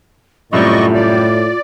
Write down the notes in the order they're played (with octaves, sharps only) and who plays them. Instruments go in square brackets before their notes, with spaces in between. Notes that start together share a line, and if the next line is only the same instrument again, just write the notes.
[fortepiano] F#2 C3 G3 [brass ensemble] A2 [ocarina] F4 [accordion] D5 D#5 C#6
[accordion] D5